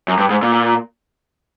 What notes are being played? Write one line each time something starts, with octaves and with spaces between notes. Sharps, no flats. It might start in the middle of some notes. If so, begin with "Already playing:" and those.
F#2
G2
G#2
A#2